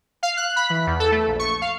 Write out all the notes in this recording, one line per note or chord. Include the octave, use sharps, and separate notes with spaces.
F5
F#6
B5
E3
E2
A4
A3
A#1
C#6
F5